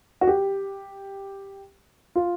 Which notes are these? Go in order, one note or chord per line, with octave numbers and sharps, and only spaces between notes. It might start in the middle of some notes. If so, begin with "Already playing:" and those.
F#4
G4
F4